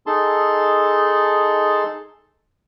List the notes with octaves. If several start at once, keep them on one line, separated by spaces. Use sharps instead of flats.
D#4 G#4 A4 A5 C6